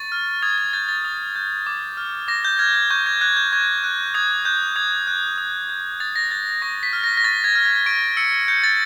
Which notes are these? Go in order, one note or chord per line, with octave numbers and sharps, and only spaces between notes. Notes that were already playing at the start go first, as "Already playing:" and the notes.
Already playing: C#6 A6
F6
D#6 G#6
G#6
G6 A6
A6
D#6
G6
D6
F6
D6 A#6
G6
F6 G#6
G#6
C#6 G6
G#6
F#6 G#6
G6
C#6 G#6
F#6
D#6 G#6
F#6 G6
D#6 G#6
F#6
D#6
G6
D#6 A6
A#6
G6 A6
C#6 A#6
B6
F6
A#6
A#6
C#6 A6
G#6
F6
G#6
C#6 D7
E6 C#7
G6 C#7
A6